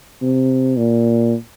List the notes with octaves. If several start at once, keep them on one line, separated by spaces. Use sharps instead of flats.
C3
A#2